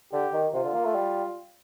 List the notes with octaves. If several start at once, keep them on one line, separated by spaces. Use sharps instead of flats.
D3 G4
D#3
C3 F4
D3
A#3
A3
G3